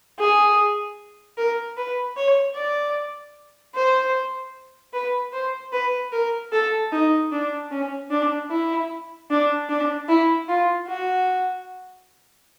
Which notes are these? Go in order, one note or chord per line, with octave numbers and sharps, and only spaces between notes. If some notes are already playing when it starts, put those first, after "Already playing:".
G#4
A#4
B4
C#5
D5
C5
B4
C5
B4
A#4
A4
D#4
D4
C#4
D4
E4
D4
D4
E4
F4
F#4